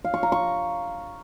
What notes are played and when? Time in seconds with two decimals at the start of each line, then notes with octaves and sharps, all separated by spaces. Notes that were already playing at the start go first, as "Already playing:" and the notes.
0.04 F5
0.14 C#6
0.23 A#5
0.32 C#6